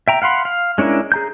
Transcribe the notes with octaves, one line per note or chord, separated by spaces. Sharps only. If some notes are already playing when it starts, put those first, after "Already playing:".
E5 G5 A#5
F5 F#5 B5 C6
F5
G#3 C#4 D4 E4 A#4
G#4 A#5 G6